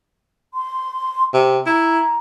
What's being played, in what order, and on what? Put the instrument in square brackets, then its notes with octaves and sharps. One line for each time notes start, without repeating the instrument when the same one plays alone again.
[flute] C6
[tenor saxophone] C3
[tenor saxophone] E4 [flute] A#5